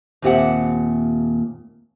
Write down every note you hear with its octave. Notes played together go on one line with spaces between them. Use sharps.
D#2 A#2 C4 G4 E5 F#5